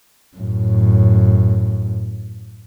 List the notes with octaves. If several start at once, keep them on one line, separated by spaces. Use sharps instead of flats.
F#2 A2